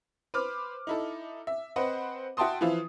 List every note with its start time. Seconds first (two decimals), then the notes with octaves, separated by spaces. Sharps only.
0.34 B4 C5 D6 F6
0.87 D#4 E4 A4
1.47 E5
1.76 C4 B4 C5 D#5 F#5
2.37 F#4 E5 G5 A5 C6 D#6
2.61 E3 F3 E4 F4 E5